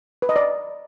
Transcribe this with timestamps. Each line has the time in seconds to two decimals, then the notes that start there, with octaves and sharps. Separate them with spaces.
0.22 B4
0.29 D#5
0.36 D5